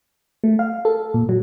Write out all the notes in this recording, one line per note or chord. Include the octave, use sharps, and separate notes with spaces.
A3
F5
A4
A#2
F#3